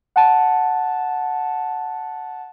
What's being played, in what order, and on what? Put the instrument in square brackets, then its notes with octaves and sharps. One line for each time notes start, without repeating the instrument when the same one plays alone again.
[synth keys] F#5 A5